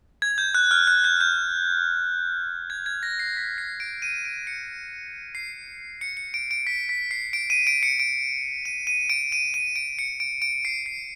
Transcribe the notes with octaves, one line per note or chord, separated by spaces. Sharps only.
G#6
G6
F#6
F6
F#6
G6
G6
G#6
G#6
A#6
C7
B6
C7
D7
D#7
D7
C#7
C7
C#7
C#7
D7
D7
B6
B6
C7
D7
D#7
D7
C#7
D7
D#7
D#7
D7
D#7
D#7
D7
C#7
D7
D7
C7
C7